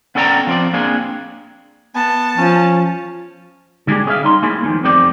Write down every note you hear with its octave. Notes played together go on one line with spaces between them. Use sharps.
B3 C#4 A4 D5 G5 A#5
F3 C4 D5
A#3 C4 D4 G#4
B3 A5
F3 C#4
D3 G#3 D4 G4 G#4
C#4 G#4 C#5 E5 F5
G3 D#4 C6
A3 A#3 C#4 E4 G#4
E2 D#3 F3
F2 A3 C4 G4 C5 D5